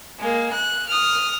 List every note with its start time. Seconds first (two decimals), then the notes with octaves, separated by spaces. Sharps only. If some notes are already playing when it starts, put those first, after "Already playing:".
0.19 G#3 A#3
0.53 F#6
0.89 D#6 F6